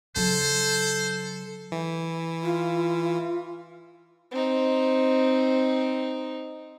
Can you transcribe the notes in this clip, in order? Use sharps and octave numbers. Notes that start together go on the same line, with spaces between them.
C#3 F#3 A4 C5
E3
F4
C4 D#4